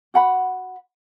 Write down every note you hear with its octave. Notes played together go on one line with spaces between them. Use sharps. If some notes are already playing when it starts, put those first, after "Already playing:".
F#4 F#5 B5